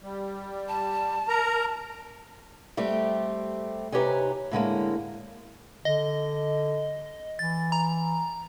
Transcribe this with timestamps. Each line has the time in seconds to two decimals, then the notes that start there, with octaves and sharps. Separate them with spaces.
0.03 G3
0.68 A5
1.28 A#4 A#5
2.77 G3 A3 C4 G4
3.92 C3 D#4 G4 B4 C#5 G#5
4.51 A2 D3 G#3 A#3
5.85 D3 D#5
7.39 E3 A6
7.72 A#5